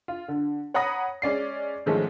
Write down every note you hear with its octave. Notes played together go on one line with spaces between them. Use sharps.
F4
D3
C#5 F#5 A#5 B5 D#6 A#6
G#3 C#4 D5 C7
G#2 D#3 F3 G#3 A3 C#4